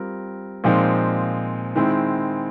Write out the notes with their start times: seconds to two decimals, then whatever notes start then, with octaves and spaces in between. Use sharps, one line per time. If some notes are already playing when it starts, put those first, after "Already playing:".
Already playing: G3 C4 F4 A#4
0.64 A#2 F3 G#3 C4 D#4
1.76 D#3 G#3 C4 E4